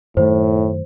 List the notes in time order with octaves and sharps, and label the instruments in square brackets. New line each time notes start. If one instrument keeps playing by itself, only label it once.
[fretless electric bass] F#2 D#3 A3 [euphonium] A2 [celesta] C5